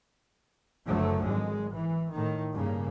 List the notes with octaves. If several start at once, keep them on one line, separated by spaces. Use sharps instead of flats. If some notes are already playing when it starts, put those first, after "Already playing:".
F#1 D3 F3 F#3 A3
G#1 G#3
E3
A2 D#3
G2 C#3 A#3